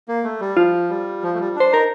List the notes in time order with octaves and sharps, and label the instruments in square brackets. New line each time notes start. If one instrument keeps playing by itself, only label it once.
[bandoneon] A#3
A3
G3
[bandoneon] F3 [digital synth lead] F4
[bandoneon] G3
F3
A3
G3
[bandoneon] D4 [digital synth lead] C5
[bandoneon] D#4 [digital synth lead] A#4